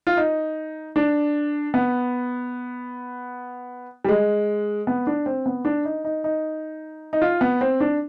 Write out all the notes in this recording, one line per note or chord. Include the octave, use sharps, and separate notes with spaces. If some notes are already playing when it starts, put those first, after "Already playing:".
F4
D#4
D4
B3
G3
G#3
B3
D4
C4
B3
D4
D#4
D#4
D#4
D#4
F4
B3
C4
D4